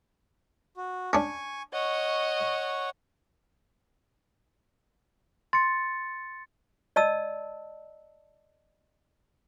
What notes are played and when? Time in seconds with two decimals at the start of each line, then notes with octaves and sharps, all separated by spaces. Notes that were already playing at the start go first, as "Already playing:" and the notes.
0.77 F#4
1.13 C#4 D4 G#5 C#6
1.73 C#5 D#5 F#5 C#6
5.53 C6 A6 C#7
6.96 D5 D#5 A5 E6